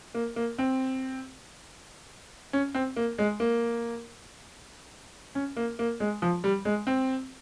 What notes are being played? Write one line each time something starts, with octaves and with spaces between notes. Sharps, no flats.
A#3
A#3
C4
C#4
C4
A#3
G#3
A#3
C#4
A#3
A#3
G#3
F3
G3
G#3
C4